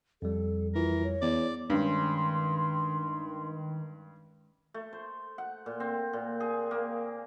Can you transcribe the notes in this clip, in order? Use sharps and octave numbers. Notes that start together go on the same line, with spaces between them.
F2 G3 A4
E3 F4 A#4
C#5
E2 D5
G2 D#3 G#3 C#4 C6
A3
C5
F#5
A#2
C4
A#2
G#4
A#3